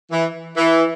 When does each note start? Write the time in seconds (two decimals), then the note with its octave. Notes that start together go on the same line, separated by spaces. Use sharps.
0.12 E3
0.56 E3